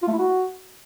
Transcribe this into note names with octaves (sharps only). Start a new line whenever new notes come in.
F4
A3
E4
F#4